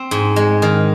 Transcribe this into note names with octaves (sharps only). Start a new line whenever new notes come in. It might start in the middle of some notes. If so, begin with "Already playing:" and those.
Already playing: C4
G#2
G#3
D#3